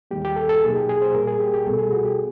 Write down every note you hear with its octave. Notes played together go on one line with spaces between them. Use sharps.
D#2 D#3 G3 A#3 G4
G4
A4
A4
B2 F#3 A#3 D#4 G#4
G4
G#4
C5
A#2 G3 A#3 A#4
G#4
G4
G4
C2 B2 G3 B3 A4
G#4
F#4
G4